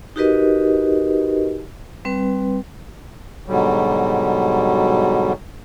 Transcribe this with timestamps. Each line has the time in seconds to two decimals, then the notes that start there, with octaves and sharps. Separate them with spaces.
0.16 D#4 F#4 G4 A#4 B4 D#5
2.05 G3 C4 B4
3.46 G#2 B2 D3 F#3 G3